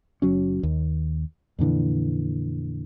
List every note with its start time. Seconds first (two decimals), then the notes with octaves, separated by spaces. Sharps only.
0.22 F#1 F#3 C#4
0.63 D#2
1.59 F2 A#2 D3 E3